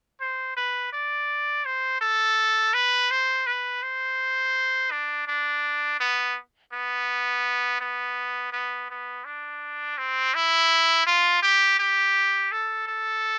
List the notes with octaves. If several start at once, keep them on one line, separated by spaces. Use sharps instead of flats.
C5
B4
D5
C5
A4
B4
C5
B4
C5
D4
D4
B3
B3
B3
B3
B3
D4
C4
E4
F4
G4
G4
A4
A4